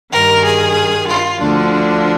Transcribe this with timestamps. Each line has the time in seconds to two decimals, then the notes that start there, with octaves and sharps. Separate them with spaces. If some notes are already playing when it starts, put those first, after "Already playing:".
0.12 G2 D#3 A#4
0.44 G#4
1.08 F4
1.40 D2 D3 F3 D4